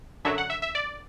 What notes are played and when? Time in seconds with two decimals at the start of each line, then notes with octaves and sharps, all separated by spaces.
0.25 F#2 D3 F#3 E5
0.38 F#5
0.50 E5
0.62 E5
0.75 D5